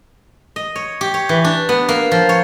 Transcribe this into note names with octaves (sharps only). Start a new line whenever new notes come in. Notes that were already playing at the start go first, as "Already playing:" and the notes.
D#5
C#5
G4
C#5
E3
D4
B3
A#3
F3
C#5